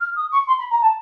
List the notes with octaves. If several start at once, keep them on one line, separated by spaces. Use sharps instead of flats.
F6
D#6
C#6
C6
B5
A#5
A5